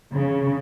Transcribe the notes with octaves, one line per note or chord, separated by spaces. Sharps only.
C#3